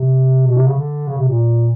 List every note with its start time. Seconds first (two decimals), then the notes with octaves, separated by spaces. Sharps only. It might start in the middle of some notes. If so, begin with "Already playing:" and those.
Already playing: C3
0.47 B2
0.57 C3
0.67 C#3
0.77 D3
1.08 C#3
1.18 C3
1.28 A#2